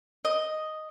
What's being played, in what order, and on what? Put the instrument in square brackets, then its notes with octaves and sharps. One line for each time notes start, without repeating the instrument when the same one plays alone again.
[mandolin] D#5